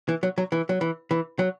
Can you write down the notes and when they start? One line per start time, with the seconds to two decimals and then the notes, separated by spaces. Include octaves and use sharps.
0.09 E3
0.23 F#3
0.38 F#3
0.52 E3
0.69 F#3
0.81 E3
1.11 E3
1.39 F#3